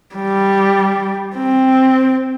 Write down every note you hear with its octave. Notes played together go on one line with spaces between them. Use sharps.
G3
C4